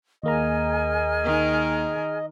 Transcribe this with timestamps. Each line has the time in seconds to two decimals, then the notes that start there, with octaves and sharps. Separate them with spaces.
0.23 D#2 A#3 G#4 D#5 G#5 A#5 F6
1.24 D#3 A#4